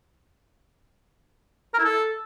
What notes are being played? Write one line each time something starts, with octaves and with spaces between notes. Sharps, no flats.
A#4
E4
A4